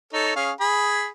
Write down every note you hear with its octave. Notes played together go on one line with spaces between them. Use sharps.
D#4 A4 C#5
C#4 G#4 F5
G#4 B5